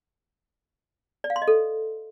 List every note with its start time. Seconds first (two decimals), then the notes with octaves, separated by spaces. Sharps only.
1.24 D5
1.30 F5
1.36 C6
1.42 D#5
1.48 A4